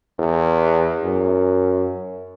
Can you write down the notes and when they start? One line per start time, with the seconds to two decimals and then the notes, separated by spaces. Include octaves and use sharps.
0.19 E2
1.04 F#2